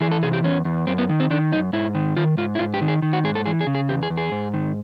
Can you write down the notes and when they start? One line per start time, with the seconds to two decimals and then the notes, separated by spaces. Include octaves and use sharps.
0.01 E3 G#4
0.12 A4
0.23 C3 G#4
0.33 G4
0.44 E2 C#4
0.65 E2
0.87 F#2 C4
0.98 B3
1.09 D#3
1.20 C4
1.30 D#3 D4
1.52 F#2 D#4
1.73 G#2 E4
1.95 D#3
2.17 D#3 F4
2.37 G#2 F4
2.55 E4
2.59 G#2 F4
2.74 G4
2.81 D#3
2.88 G#4
3.02 D#3
3.13 F#4
3.24 G#2 G#4
3.35 A4
3.46 E3 G#4
3.61 G#4
3.67 C#3
3.75 G#4
3.89 E2 G4
4.03 G#4
4.10 E2
4.17 G#4
4.32 G#2
4.54 D#3